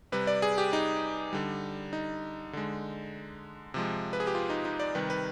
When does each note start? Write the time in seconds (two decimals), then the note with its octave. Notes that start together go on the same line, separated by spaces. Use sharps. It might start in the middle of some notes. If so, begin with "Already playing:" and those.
0.12 C3 G3 B4
0.27 D5
0.42 G#4
0.58 G4
0.73 D#4
1.33 D3 G3
1.93 D#4
2.53 D3 G#3
3.74 C3 F3 G#3
4.13 B4
4.20 G#4
4.27 G4
4.35 F4
4.50 D#4
4.65 D#4
4.80 D5
4.95 C3 D#3 G3 B4
5.10 B4